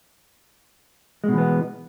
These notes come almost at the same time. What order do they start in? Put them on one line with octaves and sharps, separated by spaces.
G#3 B2 E3 B3